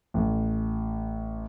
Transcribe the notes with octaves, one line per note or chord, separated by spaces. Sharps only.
A1